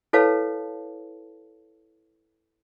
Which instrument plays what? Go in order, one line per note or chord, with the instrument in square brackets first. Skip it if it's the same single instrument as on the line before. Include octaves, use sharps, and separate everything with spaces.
[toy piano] E4 A4 B4 C#5 F5 A5